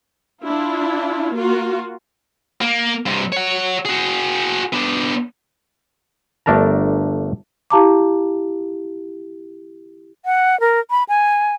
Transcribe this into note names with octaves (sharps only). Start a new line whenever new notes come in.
D4 E4 F4
A#3 F4 F#4
A#3
G2 C3
C#5 F#5
F#4 G#4
B3 D4
G1 A3 D4 A#4 A5 A#5
E4 G4 F5 A5 A#5 D6
F#5
A#4
B5
G#5